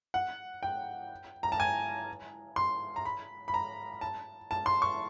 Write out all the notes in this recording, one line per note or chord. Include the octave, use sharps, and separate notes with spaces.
F#5
G5
A#5
A5
G#5
C6
A#5
B5
B5
A#5
A5
A5
C6
C#6